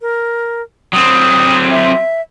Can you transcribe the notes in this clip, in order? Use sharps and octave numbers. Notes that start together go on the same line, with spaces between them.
A#4
F#3 C4 D#6
E5